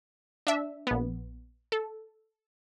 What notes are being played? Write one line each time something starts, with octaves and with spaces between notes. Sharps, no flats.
D4 E5
A#1 B3
A4